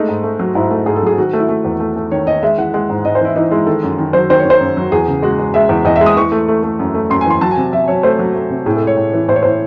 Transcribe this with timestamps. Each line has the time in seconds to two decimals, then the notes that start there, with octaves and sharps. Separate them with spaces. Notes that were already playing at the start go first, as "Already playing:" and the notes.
Already playing: G#3 A3 D#4
0.09 G#2
0.24 A3
0.39 F#3
0.55 G#2 E4
0.71 A3
0.86 G#2 G#4
0.96 A4
1.02 F#3 G#4
1.17 D#3 F#4
1.33 A3
1.39 E4
1.49 A3
1.65 E2
1.80 A3
1.96 A3
2.11 D#3 C#5
2.26 D#3 D#5
2.43 G#3 E5
2.58 E3 F#5
2.74 G#3 F#5
2.89 G#2
3.05 G#2 D#5
3.15 C5
3.21 E3 E4
3.36 E3 D#4
3.51 G#3 E4
3.67 D#3 A4
3.83 F#2
3.98 D#3
4.13 F#3 C5
4.30 D#3 C5
4.39 C#5
4.45 D#3
4.50 C5
4.61 F#2
4.77 F#3
4.92 E2 G#4
5.08 C#3
5.22 G#3 F#4
5.39 G#3
5.54 G#3 E5
5.69 E2
5.85 E2 D#5
5.96 E5
6.01 G#3
6.06 D#6
6.17 E3 C#6
6.32 A3
6.48 A3
6.63 A3
6.79 F#2
6.94 A3
7.10 F#2 C6
7.21 G#5
7.26 E3 C6
7.41 F#3 A5
7.51 G#5
7.57 C3
7.73 F#3 E5
7.88 F#3 C#5
8.03 A3 C5
8.19 F#3
8.35 A3
8.50 C3
8.66 A2 G#4
8.76 A4
8.82 G#3
8.87 C#5
8.97 A2
9.13 E3
9.28 A2 C5
9.36 C#5
9.43 A2 C5